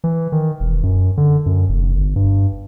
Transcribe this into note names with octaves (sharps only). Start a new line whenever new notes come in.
E3
D#3
E1
F#2
D3
F#2
F1
G1
G2